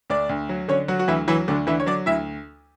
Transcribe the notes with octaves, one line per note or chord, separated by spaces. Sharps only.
D2 D4 D5
D2
F#3
D3 C#4 C#5
F#3 F#4
F#4
D2 E3 E4
E3 F#3 E4
D2 D3 D4
D3 E3 E4
C#5
F#3 D4 D5
D2 E4 E5